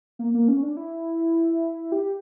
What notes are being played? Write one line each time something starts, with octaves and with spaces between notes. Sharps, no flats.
A#3
A#3
C#4
D4
E4
G4